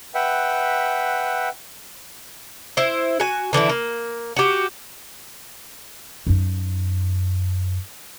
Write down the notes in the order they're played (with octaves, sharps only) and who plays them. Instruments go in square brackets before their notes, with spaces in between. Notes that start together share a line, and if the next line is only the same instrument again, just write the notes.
[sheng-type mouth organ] B4 E5 F#5 G5
[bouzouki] E4 C5
F#4 G#5
D3 E3 D4 E4
A#3
F#4 G4
[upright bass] F#2 D#4